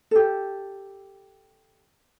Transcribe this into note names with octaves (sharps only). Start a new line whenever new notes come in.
G4 A4